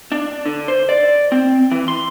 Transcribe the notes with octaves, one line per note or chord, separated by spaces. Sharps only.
D4
D3
C5
D5
C4
E3
C6